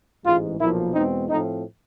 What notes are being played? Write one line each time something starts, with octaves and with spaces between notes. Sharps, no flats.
A1 G#2 E3 G#3 F4
B1 A#2 F3 A#3 E4
E2 B2 G#3 C4 D#4
A2 F3 A3 C4 D#4